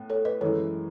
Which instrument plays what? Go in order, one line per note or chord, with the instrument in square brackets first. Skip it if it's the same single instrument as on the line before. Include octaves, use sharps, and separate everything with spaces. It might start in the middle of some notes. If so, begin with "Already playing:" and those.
Already playing: [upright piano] A2 B3
[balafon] A4 C#5
B4 D#5
[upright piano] F#2 E3 G#3 [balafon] A4 C#5